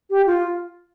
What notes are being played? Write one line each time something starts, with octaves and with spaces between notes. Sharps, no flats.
G4
F4